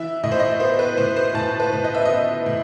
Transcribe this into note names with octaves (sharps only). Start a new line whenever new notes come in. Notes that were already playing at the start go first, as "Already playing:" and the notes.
Already playing: E3 E5
A2 D#5
C5
D#5
B3 C5
B4
A2 C5
C5
A2 A5
B4
A2
D#5
E5
B3 D#5
A2